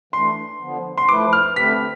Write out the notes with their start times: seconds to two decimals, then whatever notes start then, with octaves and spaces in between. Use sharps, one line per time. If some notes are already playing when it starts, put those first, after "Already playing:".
0.13 E3 A3 D4 C6
0.61 D3 F3 B3
0.98 C6
1.09 F3 A3 E4 B4 D6
1.33 F6
1.56 D3 A3 C4 G4 B4 B6